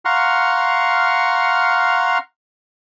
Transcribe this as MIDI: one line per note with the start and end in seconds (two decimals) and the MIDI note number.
0.05 2.18 77
0.05 2.18 78
0.05 2.18 82
0.05 2.18 84
0.05 2.18 85
0.05 2.18 89